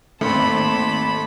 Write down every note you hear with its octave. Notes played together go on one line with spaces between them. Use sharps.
G#1 D#2 A3 C4 A4 B5 C6